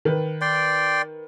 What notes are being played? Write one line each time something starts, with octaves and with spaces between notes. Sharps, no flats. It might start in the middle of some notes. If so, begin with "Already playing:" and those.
D#3 B4
D5 G5 C6